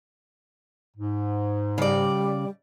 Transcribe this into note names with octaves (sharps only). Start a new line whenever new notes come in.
G#2
C#3 G3 D5